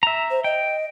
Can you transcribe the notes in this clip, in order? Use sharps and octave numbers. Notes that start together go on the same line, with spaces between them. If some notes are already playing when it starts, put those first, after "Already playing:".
E5 A#5
C5
D#5 G5